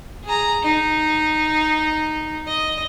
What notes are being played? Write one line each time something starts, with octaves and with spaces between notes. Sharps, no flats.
G#4 A#5
D#4
D#5